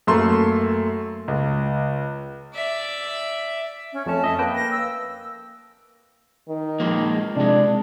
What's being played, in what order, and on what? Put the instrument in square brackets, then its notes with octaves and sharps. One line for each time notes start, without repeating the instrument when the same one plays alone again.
[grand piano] F#2 A3 A#3 A4 C6
C#2
[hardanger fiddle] D5 E5
[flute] C#4
[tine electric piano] F2 A3 C#4 [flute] A5
[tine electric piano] D#5 E5
A#3 B4 G5
[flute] A#6
E6
[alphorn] D#3
[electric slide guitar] F3 G#3 A#3
[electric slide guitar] C3 G#3 [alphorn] D4